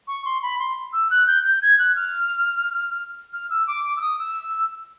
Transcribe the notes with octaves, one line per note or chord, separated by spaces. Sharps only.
C#6
C6
B5
C6
E6
F#6
G6
G6
G#6
F#6
F6
F6
E6
D6
D6
E6
D#6
E6